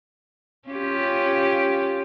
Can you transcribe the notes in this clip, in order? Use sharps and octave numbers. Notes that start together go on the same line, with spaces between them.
C#4 F4 G4